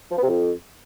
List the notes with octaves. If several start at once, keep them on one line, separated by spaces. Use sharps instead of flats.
F3
B3
C3
F2